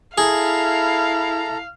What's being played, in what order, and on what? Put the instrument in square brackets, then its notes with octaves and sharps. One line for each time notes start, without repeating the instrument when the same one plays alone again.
[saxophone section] E4 [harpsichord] G#4 [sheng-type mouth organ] A4 A#5 [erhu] F5